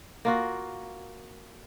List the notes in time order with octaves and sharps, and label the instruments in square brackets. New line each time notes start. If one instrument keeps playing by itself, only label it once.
[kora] A#3 F4 F#4